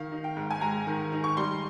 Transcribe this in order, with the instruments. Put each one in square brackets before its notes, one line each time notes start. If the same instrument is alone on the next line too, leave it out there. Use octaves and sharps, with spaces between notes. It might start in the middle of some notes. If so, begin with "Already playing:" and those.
Already playing: [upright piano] D#3 F5
D#4
G5
G#2
G#5
G#3 A#5
D#3
D#4
C#6
G3 C6